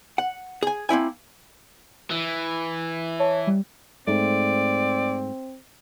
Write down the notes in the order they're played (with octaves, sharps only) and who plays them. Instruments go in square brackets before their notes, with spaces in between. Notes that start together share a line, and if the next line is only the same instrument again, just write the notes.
[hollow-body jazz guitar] F#5
G#4 G#5
A#3 C4 E4 G#5
[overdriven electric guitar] E3
[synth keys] C#5 A5
G3
[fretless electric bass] G#2 A3 [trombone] C4 [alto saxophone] D5